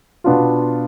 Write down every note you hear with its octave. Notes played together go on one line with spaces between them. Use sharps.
B2 B3 D4 F4